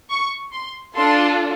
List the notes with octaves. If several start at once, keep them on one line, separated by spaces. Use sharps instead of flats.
C#6
C6
D4 F4 A4 C6